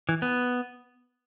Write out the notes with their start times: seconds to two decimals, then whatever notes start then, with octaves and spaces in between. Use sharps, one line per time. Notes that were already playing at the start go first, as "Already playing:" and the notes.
0.09 E3
0.22 B3